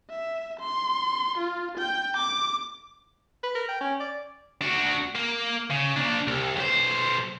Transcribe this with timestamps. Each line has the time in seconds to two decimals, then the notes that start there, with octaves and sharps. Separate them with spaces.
0.10 E5
0.60 C6
1.38 F4
1.78 G5
2.17 D6
3.43 B4
3.55 A#4
3.69 G5
3.81 C#4
4.00 D5
4.61 D4 F#4
5.15 A#3
5.70 C#3
5.96 A#3 D4
6.27 C2
6.56 B1 C5